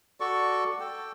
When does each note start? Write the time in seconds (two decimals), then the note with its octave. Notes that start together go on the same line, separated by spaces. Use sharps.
0.20 F#4 A4 D5 C#6
0.80 A4 G5